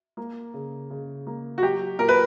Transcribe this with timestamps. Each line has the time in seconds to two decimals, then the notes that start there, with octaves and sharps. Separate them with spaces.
0.17 A#3
0.54 C#3
0.90 C#3
1.27 A#3
1.58 F#4
1.63 F#3 G4
1.99 A#2 A#4
2.09 B4